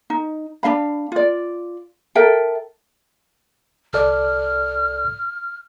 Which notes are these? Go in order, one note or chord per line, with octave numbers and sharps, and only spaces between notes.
D#4
D4 D#4 F5 B5
F4 D5
A4 A#4 E5 G5
C2 A4 D5 F6